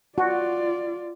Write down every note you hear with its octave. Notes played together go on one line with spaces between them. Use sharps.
F4 F#4 D5